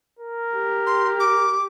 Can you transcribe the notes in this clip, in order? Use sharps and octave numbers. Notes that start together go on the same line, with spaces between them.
A#4
G4
C6
D6